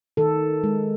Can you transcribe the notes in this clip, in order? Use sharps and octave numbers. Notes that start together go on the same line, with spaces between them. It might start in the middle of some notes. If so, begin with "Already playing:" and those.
D#3 A4
G#3